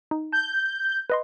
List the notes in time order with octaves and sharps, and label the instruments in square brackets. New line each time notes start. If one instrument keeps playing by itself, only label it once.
[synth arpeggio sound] D#4
[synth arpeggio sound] A5 [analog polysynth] G6
[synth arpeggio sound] B4 D#5 C6